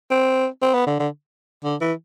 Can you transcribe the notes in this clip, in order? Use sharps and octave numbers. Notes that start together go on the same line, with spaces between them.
C4
C4
B3
D3
D3
D3
E3